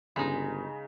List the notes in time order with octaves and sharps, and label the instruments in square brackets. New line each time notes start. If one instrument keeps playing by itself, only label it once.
[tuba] G1 [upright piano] C#3 [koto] G#3 D#4